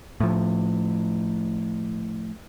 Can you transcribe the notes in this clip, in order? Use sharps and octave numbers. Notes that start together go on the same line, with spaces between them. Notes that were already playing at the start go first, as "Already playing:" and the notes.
A2 F3